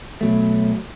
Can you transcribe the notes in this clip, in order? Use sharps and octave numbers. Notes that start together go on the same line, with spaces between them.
B2 F#3 A3